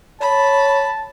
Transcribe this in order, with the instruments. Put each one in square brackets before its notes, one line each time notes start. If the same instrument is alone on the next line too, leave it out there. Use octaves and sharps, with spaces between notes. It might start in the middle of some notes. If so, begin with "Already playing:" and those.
[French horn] C#5 [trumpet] A5 [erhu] B5